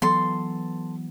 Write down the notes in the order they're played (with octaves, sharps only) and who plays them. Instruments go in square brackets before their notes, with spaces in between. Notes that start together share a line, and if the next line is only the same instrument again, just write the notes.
[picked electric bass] E3 F#3 B3 [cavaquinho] A4 C6